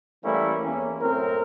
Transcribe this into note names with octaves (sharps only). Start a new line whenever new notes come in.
E3 G3 A3 A#3 C#4 E4
E2 A#3 C#4
F#2 A2 C4 A#4